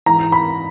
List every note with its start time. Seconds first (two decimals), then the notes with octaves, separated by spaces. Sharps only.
0.06 G#2 E3 A#5
0.32 B5